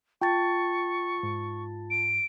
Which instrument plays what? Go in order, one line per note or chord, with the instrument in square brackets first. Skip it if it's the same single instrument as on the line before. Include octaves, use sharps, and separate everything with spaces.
[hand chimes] F4 A5 A6 [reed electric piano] G5 [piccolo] C#6
[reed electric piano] G#2
[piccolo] D7